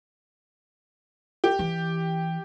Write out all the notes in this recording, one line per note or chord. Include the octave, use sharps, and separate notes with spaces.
G4
E3